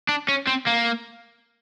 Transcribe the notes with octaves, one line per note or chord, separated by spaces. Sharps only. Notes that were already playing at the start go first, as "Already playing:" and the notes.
D4
C#4
C4
A#3